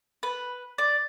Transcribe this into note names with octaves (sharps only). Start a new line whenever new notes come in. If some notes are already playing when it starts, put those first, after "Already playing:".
B4
D5